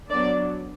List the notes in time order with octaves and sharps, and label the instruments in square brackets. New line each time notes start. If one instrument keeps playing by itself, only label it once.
[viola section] F#3 B3 D4 D5